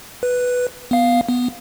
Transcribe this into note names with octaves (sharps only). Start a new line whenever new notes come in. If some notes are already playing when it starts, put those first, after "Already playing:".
B4
B3 F5
B3